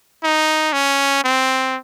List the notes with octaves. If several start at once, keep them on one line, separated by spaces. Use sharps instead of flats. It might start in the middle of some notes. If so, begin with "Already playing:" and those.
D#4
C#4
C4